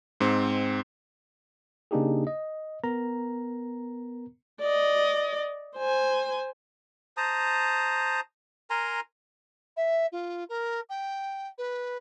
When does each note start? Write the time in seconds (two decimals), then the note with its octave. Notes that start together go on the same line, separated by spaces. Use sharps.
0.21 G#2 C4
1.91 C#3 A#3 D4 D#4 G4 G#4
2.27 D#5
2.84 B3 A#4 A#5
4.60 D5 D#5
5.77 C5 G#5
7.17 C5 A5 A#5 D#6
8.70 A#4 G#5 A#5 C6
9.77 E5
10.12 F4
10.49 A#4
10.90 G5
11.58 B4